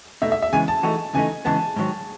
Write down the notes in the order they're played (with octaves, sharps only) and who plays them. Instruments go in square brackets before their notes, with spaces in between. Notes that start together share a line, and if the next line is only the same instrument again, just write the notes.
[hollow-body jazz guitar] B2 A3 D#4 [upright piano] E5
[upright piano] E5
E5
[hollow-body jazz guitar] C#3 E3 G#3 B3 [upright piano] G#5
[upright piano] A5
[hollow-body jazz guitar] E3 A3 D#4 F#4
[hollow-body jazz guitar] C#3 E3 A3 D#4 [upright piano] G#5
[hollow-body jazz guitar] C#3 E3 G#3 B3 [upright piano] A5
[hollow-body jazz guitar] G#2 D#3 F#3